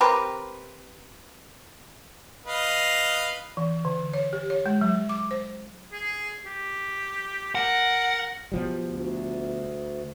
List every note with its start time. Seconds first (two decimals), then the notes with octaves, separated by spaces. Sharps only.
0.01 C4 G4 A#4 B4
2.46 B4 D#5 F5
3.57 E3
3.85 D3
4.13 C#5
4.33 G4
4.50 C#5
4.66 G#3
4.81 F#3
5.09 D6
5.31 C5
5.92 G#4
6.46 G4
7.55 A#4 F#5
8.52 B2 F3 G3
8.85 D2